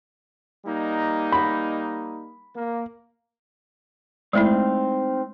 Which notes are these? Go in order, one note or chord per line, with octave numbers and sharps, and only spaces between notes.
G3 A#3 D#4
B5
A#3
G#3 A3 C4 D#4 E4 F5